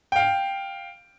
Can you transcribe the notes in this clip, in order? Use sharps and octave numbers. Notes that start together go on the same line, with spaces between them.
F5 G5